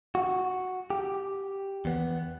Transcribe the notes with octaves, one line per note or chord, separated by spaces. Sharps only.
F#4
G4
E2 B3